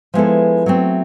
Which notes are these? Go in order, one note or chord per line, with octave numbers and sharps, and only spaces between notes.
F3 G#3 B3 E4 A4
F#3 A3 C4